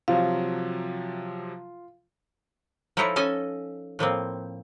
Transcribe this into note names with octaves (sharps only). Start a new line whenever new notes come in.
C3 F3 F#3 F4 F5
F3 D#4 E4 A4 C#5 A#5
C#4 A4 D#5 G#5
A2 F3 A#3 C4